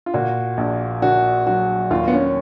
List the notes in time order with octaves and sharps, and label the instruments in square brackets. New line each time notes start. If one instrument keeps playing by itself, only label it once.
[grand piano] F4
[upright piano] A#2 [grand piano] F#4
[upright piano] A#1
[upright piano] A#2 [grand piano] F#4
[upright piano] F#3 [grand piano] F#4
[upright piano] D#2 [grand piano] F4
[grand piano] B3
C#4